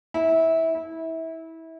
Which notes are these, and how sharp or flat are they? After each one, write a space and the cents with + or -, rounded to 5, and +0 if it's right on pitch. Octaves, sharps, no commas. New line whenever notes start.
E4 -20
E4 -25